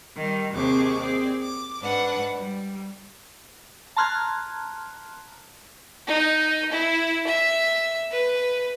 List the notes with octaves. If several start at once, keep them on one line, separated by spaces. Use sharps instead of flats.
D#3 G3
D#2 C3 C4 G#4 C#6 D6
C4 G#4 D5
D6
G#2 D4 B4 F#5
G3
A5 A#5 C6 F6 F#6 G#6
D#4
E4
E5
B4